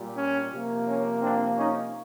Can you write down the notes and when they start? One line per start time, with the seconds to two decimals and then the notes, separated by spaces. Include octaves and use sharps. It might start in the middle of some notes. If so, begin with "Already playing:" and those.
Already playing: A#2 G3
0.17 C#4
0.52 C3 F3 A#3
0.87 C#4
1.23 C4 D4
1.58 C#4 D#4